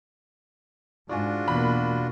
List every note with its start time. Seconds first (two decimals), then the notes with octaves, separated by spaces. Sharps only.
1.09 G#2 D4 F4 F#4 D5 G#5
1.48 E2 B2 A#3 B5